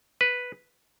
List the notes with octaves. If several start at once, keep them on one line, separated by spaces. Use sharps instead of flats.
B4